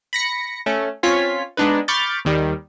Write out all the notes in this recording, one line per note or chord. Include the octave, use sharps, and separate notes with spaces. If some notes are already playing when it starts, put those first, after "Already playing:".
B5 A#6 C#7
A3 C#4
C4 C#4 F4 C#5 B6
G#3 B3 D4 D#4 B4
B5 C#6 D6 F6 G6 A6
D#2 D#3 G3